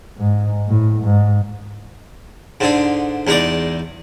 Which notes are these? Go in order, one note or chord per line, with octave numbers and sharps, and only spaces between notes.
G#2
A2
G#2
G#2 D3 G#4
E2 G#3 D#4 D5